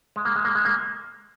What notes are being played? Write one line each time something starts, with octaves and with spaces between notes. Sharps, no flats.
G#3
A#3
G#3
A#3
G#3
A#3